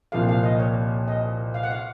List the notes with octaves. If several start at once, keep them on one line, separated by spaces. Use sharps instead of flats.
C2 A#2 F3 A#3 F5
F5
D#5
C#5
D#5
F5
F#5
F5